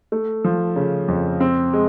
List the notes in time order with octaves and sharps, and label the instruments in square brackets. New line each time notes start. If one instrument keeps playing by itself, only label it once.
[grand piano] A3
F3
C#3
F2
C4
G#3